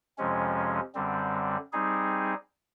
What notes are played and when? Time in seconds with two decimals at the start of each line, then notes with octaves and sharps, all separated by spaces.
0.18 F2 C3 F3 G#3 C#4
0.95 F#2 D3 G3 C4
1.72 G3 C4 D#4 G#4